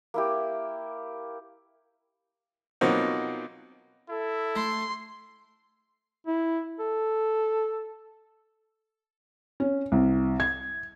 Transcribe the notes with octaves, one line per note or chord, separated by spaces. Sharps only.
A#3 E4 G4
B2 F3 F#3 A#3 C4 D#4
E4 A4
A3 C6
E4
A4
C#4
C2
G#6